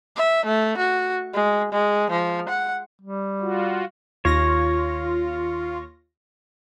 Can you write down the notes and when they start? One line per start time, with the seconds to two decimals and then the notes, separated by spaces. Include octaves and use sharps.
0.16 E5
0.46 A3
0.77 F#4
1.33 G#3
1.72 G#3
2.11 F3
2.49 F#5
3.02 G3
3.41 F4 F#4
4.25 D#2 F4 C#5 A#6